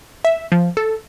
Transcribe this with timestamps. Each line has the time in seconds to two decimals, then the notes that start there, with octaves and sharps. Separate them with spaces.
0.25 E5
0.52 F3
0.77 A4